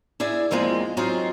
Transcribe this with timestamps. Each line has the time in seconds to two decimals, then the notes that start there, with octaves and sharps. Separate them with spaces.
0.20 E4 G#4 D5 E5
0.51 E2 F3 G#3 A#3 C4
0.97 F#3 C4 D#4 F4 G#4 F5